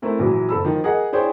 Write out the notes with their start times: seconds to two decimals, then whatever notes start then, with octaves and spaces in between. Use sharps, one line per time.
0.02 A3 C4 E4 A#4
0.19 A#1 E3 F#3
0.49 F#1 A4 B5 E6
0.65 D#3 F3
0.84 G#4 A#4 D#5 F#5
1.12 D4 E4 G#4 C5 C#5 G5